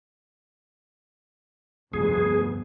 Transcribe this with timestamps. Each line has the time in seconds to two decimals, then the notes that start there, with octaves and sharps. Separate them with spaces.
1.93 F1 D2 G2 B3 G#4